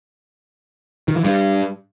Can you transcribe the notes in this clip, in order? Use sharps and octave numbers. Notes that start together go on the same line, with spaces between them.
D#3
E3
G2